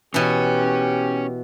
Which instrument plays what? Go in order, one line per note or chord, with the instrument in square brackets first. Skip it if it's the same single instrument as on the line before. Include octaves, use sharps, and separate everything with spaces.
[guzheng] B2 E3 [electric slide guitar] C#4 C#5 [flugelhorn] G4